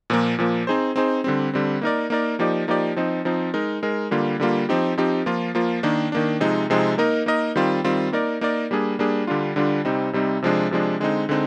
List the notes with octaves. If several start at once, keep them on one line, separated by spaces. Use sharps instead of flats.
A#2 F3 A#3
A#2 F3 A#3
C4 D#4 G#4 C5
C4 D#4 G#4 C5
D3 G3 C4
D3 G3 C4
A#3 D#4 A#4 D5
A#3 D#4 A#4 D5
F3 A#3 D#4 G4 D5
F3 A#3 D#4 G4 D5
F3 C4 D#4
F3 C4 D#4
G#3 D#4 A#4
G#3 D#4 A#4
D3 G3 A#3 F4
D3 G3 A#3 F4
F3 C4 D#4 G4
F3 C4 D#4 G4
F3 A#3 F4
F3 A#3 F4
D#3 A#3 D4
D#3 A#3 D4
C3 F3 G#3 C4 D#4
C3 F3 G#3 C4 D#4
A#3 D#4 A#4 D#5
A#3 D#4 A#4 D#5
D#3 G3 C4 F4
D#3 G3 C4 F4
A#3 D#4 A#4 D5
A#3 D#4 A#4 D5
G3 A#3 D4 G#4
G3 A#3 D4 G#4
D3 G3 D4 F4
D3 G3 D4 F4
C3 G3 C4 D#4
C3 G3 C4 D#4
C3 F3 G#3 D4
C3 F3 G#3 D4
D3 G#3 C4 D#4
D3 G#3 C4 D#4